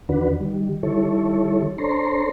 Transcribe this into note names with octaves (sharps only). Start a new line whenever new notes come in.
E2 D#3 D4 F#4 B4
D#3 G3
D#3 G3 E4 A4 C#5
D4 A4 C5 C#5 A#5 C6